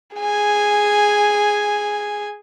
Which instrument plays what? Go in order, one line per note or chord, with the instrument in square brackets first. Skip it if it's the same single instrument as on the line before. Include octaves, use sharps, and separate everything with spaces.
[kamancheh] G#4 G#5